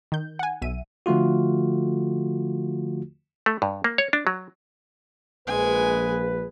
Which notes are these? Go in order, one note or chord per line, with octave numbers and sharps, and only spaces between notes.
D#3 G6
F#5 G#5
B1 E5 D#7
D3 F3 A3 F4 F#4
A3
G2
A#3
C#5
D4
F#3
A#1 G#3 B4 G#5